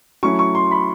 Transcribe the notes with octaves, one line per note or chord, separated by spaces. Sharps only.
F#3 A3 C#4 E4 C#6
C#6
C6
B5